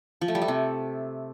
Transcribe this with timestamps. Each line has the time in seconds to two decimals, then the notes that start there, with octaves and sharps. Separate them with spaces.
0.21 F3
0.28 A3
0.35 G3
0.42 A3
0.48 C3